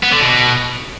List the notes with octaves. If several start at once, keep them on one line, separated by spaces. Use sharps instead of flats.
B3
D3
B2